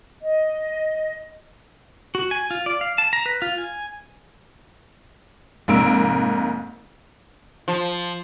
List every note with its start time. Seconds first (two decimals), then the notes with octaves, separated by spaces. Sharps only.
0.22 D#5
2.15 F#4
2.31 G#5
2.51 F4
2.66 D5
2.81 F5
2.98 A5
3.13 A#5
3.26 B4
3.42 F4
3.58 G#5
5.68 F1 G#2 A#3 E6 D7
7.68 F3